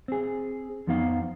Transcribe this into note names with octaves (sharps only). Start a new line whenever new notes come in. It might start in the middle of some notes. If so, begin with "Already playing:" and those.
C4 G#4
F2 F3 B3 D#4 F5